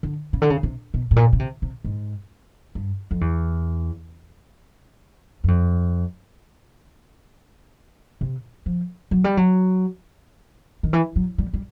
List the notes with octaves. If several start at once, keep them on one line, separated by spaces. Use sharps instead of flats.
D3
C#3
D3
C#3
C3
B2
A2
A#2
C#3
C3
C3
G#2
G2
F2
E2
F#2
F2
C3
F3
F#3
G3
F#3
D#3
E3
F#3
G3
G3